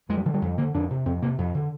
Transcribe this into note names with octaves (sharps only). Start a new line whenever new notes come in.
F2 G#3
G3
D3 F3
G3
F2
D3 A#3
F2 D4
C3
F2 C4
C3 A#3
F2
D3